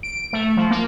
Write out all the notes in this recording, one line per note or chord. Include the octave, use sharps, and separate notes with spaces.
D7
A3
F3
A#3